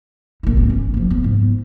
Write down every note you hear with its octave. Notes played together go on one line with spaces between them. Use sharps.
A#1 D#4
G#1 F2
C#4
F#1 F3
B3
G#2